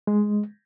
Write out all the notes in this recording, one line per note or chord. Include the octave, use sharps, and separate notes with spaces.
G#3